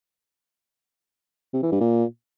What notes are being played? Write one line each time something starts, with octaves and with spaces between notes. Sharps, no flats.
C3
E3
G2
A#2